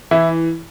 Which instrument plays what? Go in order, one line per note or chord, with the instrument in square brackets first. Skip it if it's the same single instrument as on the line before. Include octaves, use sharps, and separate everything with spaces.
[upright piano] E3 E4